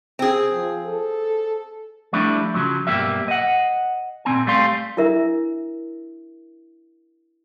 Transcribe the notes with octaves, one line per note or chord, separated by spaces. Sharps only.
C4 G#4
F3
A4
F3 G3 A3 D4 E4
C#3 F3 F#3
B1 E2 G2 A#3 G4 E5
D#5 F#5
A#2 F#3 C4 G#5
G3 A3 F5 C6
D4 E4 A#4 E5